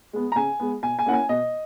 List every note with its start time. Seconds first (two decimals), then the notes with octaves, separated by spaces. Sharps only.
0.13 G#3 B3
0.32 A#5
0.36 C#3 G#5
0.60 G#3 B3
0.82 B2 G#5
0.99 G#5
1.06 A#3 C#4 E4 F#5
1.13 G#5
1.29 B2 D#5